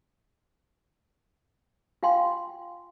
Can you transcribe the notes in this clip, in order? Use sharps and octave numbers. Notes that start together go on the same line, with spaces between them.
F4 F5 G5 G#5 C6